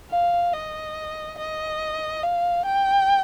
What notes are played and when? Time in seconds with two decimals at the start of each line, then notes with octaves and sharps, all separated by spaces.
0.10 F5
0.53 D#5
1.38 D#5
2.23 F5
2.65 G5